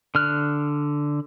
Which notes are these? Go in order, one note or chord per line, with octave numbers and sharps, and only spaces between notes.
D3 F6 F#6